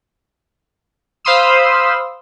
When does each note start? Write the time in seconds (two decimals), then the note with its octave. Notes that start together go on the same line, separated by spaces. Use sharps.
1.25 C5 F5 B5 C6 D#6 E6